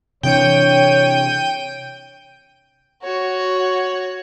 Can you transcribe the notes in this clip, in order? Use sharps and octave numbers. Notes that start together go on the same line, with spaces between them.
C3 E3 D4 C#5 G5 G6 D#7
F#4 C#5